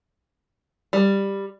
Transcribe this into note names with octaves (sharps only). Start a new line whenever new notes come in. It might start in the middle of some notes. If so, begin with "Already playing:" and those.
G3